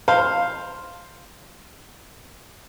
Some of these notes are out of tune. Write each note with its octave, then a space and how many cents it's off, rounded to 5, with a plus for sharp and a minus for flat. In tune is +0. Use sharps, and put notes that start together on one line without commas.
C5 +0 F5 +0